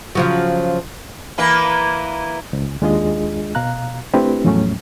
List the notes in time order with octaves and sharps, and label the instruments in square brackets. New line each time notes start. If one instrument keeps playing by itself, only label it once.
[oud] C#3 F3 F#3
[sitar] E3 A#3 B4
[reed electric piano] C#2
D#2 G#3 D4 F4 G#4 D#5
B2 F5 A#5 F#6
A3 C4 D4 E4 G4 B4
E2 A2 F3 F#3 A3 C#4